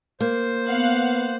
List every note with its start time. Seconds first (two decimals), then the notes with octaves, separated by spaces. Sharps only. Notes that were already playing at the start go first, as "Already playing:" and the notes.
0.21 A#3 C5
0.69 B3 F5 F#5 F#6